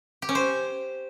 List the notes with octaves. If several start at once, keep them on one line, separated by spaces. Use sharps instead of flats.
G4
C#4
C5